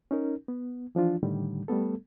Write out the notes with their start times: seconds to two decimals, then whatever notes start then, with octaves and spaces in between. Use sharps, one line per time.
0.11 C#4 D#4 A#4
0.48 B3
0.95 E3 F3 D4 F4
1.23 A2 D3 D#3 G3
1.68 G3 A3 B3 A4